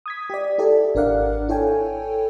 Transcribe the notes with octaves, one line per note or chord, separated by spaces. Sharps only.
D#6 G#6 B6
G4 D5
E4 G4 A4 D5
G#1 D4 A#4 D5 F5 F#5
E4 A4 C#5 G5 G#5